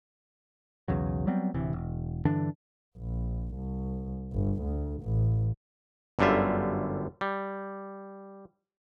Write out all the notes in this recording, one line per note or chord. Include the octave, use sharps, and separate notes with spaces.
B1 E2 C#3 F#3
F#3 G3 B3 C4
D1 C3 E3
E1
G2 D3 E3 D4
A#1
C2
G1
D2
A1
G1 F#2 D3 G3 F4 E5
G3